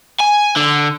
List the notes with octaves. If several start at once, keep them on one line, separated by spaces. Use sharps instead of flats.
G#5
D3